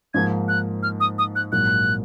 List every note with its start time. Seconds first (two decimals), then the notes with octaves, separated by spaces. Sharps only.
0.14 G#2 F3 A#3 G#6
0.48 F#6
0.83 F6
1.00 D#6
1.18 D#6
1.36 F#6
1.52 A#1 G#2 F#3 A#3 F#6